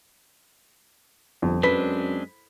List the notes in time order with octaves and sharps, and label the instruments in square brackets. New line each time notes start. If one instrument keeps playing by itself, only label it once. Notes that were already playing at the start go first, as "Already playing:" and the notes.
[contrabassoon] G1 [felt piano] F2
[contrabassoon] F#2 [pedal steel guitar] G#3 C4 D4 [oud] B4 [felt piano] B6